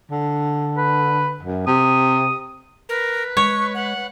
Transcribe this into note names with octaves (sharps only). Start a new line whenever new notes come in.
D3
B4
F#2
C3 D#6
A#4 B4
G#3 C#5 C#6
F#5